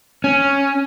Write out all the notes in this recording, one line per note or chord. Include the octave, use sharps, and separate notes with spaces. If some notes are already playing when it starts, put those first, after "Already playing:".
C#4